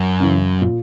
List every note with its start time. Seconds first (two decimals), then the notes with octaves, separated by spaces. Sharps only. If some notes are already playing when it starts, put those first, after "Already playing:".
Already playing: F#2
0.20 C#3 E3
0.62 A#2